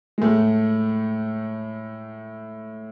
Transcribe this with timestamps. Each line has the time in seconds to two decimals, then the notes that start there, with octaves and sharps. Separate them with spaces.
0.18 G#3
0.22 A2 A3